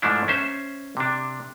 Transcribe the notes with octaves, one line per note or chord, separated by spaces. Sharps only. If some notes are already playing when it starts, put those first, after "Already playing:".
G#2 F3 A3 D4 E4
C#4 C5 E5
C3 D4